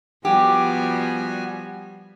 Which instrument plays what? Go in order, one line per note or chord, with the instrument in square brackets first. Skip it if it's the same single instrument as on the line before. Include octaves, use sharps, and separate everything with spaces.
[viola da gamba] F3 G3 B3 [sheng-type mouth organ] F#4 G#5 [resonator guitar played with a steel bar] G4